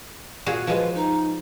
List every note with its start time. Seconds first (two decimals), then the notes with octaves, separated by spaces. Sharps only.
0.46 A#2 F#4 G#4
0.67 F3 G#3 B4
0.95 D#4